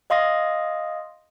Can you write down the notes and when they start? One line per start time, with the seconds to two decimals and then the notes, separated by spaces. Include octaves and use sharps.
0.10 D#5 F5 C6 D#6 A#6